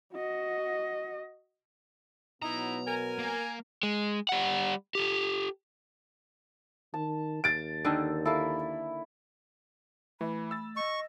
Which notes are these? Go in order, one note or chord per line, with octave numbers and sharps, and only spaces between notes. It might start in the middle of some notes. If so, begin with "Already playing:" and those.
F#4 D#5
B2 F#3 B3 D#4 E4 A#5
A#4 G#5
A#3
G#3
G3 F#5
G4 A4
D#3 A5
D#2 A6 D7
D3 D#3 A4
A#3 E4 A4
E3 A3 B5
E6 A6
D#5 C#6